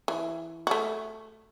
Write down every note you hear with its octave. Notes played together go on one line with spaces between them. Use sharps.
E3
A3 F#4